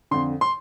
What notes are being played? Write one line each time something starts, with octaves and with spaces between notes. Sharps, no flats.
F2 D3 C6
C6